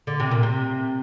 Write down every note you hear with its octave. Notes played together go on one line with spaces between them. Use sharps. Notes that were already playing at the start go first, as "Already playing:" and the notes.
D3
C3
A#2
C3